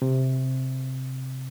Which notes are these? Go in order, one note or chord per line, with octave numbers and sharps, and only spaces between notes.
C3